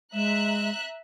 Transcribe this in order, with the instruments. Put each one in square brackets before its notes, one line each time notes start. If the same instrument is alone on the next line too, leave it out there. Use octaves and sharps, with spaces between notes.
[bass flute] G#3 [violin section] E5 A#5 F#6